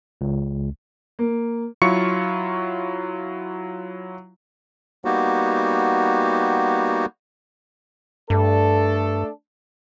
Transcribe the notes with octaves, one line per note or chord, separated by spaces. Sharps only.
C#2
A#3
F#3 E4 F4 C#6 C#7
G3 A#3 B3 D#4 F#4 G4
G2 A3 D4 A4